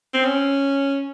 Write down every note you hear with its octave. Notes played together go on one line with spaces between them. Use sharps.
C4
C#4